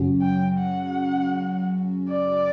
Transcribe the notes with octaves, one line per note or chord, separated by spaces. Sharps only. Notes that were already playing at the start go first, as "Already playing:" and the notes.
Already playing: F#2 C#3 F#3 C#4 F#4
G5
F#5
D5